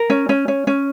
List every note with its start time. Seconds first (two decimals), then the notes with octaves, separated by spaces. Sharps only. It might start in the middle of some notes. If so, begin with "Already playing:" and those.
Already playing: A#4
0.10 C#4
0.29 C#4
0.48 C#4
0.67 C#4